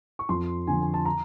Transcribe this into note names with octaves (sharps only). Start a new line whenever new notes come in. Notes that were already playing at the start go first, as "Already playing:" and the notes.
C#6
F2 C6
D3 F3 G#5
G#5
A5
A#5